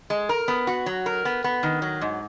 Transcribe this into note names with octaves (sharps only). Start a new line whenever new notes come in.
G#3
A#4
B3
F#4
F#3
A#4
B3
B3
D#3
F#3
G#2